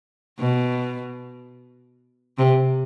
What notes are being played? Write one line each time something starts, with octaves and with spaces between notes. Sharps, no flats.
B2
C3